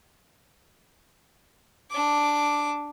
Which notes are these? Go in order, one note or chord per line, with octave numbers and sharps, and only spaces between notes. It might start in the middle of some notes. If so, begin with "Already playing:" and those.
D4 D6